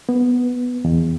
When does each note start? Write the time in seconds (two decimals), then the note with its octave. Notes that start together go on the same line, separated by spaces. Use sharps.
0.09 B3
0.85 E2